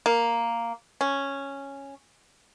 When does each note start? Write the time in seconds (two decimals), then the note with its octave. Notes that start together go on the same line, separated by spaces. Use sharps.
0.06 A#3
1.01 C#4